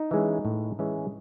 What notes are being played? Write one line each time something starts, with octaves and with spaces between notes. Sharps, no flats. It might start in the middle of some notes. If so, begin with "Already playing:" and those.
Already playing: D#4
E3 G#3 C#4
A2
E3 G#3 C#4